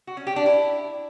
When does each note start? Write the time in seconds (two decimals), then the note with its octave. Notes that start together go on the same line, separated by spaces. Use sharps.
0.07 F#4
0.17 C#4
0.27 G4
0.36 D4
0.46 E4